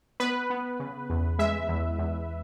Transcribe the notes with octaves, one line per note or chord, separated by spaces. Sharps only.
B3 B4
B3
C#3
E2
G#3 E5
E2
E2